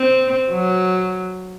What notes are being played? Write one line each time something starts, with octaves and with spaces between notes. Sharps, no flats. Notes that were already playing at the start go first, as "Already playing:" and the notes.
Already playing: C4
F#3